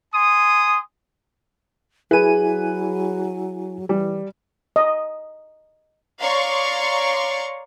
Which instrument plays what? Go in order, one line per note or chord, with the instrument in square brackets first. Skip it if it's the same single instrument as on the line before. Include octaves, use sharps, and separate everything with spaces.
[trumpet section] G#5 C6 D#6
[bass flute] F#3 [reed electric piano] E4 G#5 [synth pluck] G#4 D#7 [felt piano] B4
[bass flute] E3 [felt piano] G3
[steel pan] D#5
[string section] C#5 D5 F5 A#5 C6 C#6